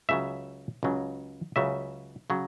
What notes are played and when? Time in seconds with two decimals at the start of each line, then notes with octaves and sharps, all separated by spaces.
0.09 C#2 C#3 F#3 E5
0.83 C#2 C#3 F#3
1.56 C#2 C#3 F#3 E5
2.30 C#3 F#3